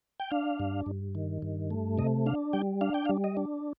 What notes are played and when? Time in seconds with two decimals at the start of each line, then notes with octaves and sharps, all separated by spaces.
0.20 G5
0.31 D4 F5
0.60 G2
0.86 G2
1.15 D#3
1.42 G2
1.70 A3
1.98 C3 D#5
2.26 D4 F5
2.53 G3 G5
2.81 D4 F5
2.94 G5
3.05 F5
3.09 G3
3.24 D#5
3.37 D4